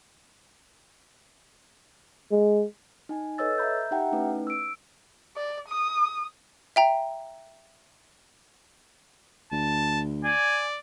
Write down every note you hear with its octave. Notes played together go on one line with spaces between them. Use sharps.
G#3
D#4 G#5
A4 B4 C#5 D#5 E6 A6
E5 A#5 B5 G6
D#4 G4 E5 F#5 G5 A#5
A3 C#4 D#4 E4 B4
E6 D7
D5
D#6
E5 G5 A#5
D2 A5
D5 G#5